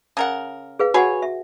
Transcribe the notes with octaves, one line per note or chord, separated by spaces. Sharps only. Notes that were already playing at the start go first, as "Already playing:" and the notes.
C#3 A#4 F#5
G#4 B4 F5
F#4 G#4 B4 C#5 F#5 G#5
E5